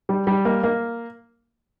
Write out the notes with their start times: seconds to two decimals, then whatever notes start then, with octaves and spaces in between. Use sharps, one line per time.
0.09 G3
0.27 G3
0.45 A#3
0.63 A#3